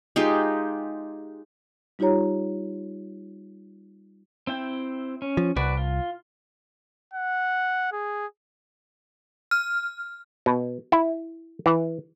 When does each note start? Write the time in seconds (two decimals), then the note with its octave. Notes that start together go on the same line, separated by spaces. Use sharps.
0.16 G#3 D#4 F4 G4
1.99 G3 D#4 F4 G4 C#5 A#5
4.47 C4 E4 G5
5.22 C#4
5.37 F3
5.56 C2 F#4 B4 D5
5.77 F4
7.13 F#5
7.92 G#4
9.51 F6
10.46 B2
10.92 E4
11.66 E3